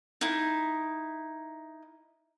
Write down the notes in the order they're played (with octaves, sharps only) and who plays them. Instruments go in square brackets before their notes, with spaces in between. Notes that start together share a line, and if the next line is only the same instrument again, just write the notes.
[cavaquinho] D#4 E4